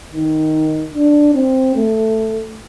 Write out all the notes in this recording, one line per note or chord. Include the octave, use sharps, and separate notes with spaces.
D#3
D4
C4
A3